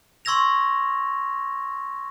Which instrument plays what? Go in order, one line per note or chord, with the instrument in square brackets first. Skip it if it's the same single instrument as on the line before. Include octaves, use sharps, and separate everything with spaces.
[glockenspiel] C6 C#6 E6 G#6 A#6 F7